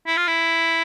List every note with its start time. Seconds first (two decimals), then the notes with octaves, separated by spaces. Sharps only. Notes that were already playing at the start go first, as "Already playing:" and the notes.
0.07 E4
0.17 F4
0.28 E4